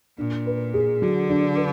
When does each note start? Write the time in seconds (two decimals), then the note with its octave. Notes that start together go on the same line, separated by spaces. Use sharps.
0.18 A#2 D4
0.46 B4
0.74 G#4
1.02 D3 F#3
1.29 D4
1.56 B4